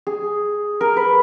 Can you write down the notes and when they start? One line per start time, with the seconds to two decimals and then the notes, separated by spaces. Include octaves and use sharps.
0.07 G#4
0.81 A#4
0.97 B4